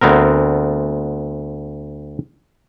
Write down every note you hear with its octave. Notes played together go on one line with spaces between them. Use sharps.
D2 B3 C4 A#4